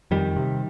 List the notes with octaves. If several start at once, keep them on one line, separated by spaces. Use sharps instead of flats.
F2 D#3 G3
C3